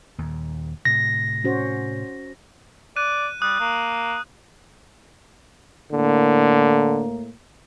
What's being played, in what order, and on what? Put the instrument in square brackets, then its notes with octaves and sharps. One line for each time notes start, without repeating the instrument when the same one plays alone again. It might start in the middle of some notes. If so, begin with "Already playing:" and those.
[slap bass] D#2 A#2
[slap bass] A2 C3 [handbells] A#6
[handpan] C#4 F#4 C5
[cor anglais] D5 [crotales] F#6 D#7
[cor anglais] G3 [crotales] D#6 F#6
[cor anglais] A#3
[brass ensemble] A2 A#3 [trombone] D3